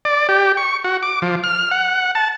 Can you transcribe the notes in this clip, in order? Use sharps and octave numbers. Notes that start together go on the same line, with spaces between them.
D5
G4
C#6
F#4
D6
F3
F6
F#5
A5